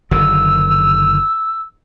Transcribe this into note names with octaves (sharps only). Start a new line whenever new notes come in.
F#1 D3 D#3 E6